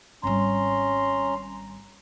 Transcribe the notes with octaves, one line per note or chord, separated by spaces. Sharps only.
G#1 G3 C#4 A#5 C6